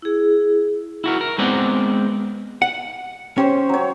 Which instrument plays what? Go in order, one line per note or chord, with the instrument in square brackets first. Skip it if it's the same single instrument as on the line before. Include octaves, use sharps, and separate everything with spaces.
[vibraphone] E4 G#4
[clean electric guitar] E4 F#4 A#4
A#4
G#3 B3 C4 D5 F#5 A#5
[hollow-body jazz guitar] F#5
[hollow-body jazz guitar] C#4 [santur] G4 C5 C#5
[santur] F#3 C#5